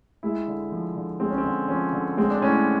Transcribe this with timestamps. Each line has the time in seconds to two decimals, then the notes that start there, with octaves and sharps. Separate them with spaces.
0.23 G#3 E4
0.47 D3
0.72 F3
0.96 D3
1.20 G#3 C4
1.30 C#4
1.38 C4
1.45 D3
1.68 F3 C#4
1.93 D3
2.17 G#3 C4
2.30 D4
2.42 A2 C#4